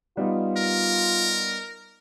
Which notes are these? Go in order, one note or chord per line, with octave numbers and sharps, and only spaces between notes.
G3 B3 D#4 F4
A#4